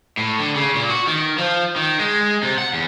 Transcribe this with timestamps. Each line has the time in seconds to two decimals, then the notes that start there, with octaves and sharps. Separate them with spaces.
0.17 A2
0.39 D3
0.55 C#3
0.75 A#2
0.90 F#4
1.07 D#3
1.38 F3
1.76 D#3
1.99 G#3
2.43 C3
2.58 F#5
2.73 E2